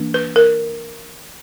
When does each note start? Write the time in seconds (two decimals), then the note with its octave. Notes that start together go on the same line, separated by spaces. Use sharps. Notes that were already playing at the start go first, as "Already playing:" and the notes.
Already playing: E3 A#3 D4
0.14 B4
0.36 A#4